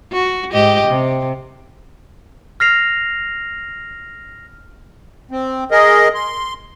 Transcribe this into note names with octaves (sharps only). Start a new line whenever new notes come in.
F#4
G#2 G4 D#5
C3
F6 A#6 C7 F7
C4
G#4 A#4 D#5
C6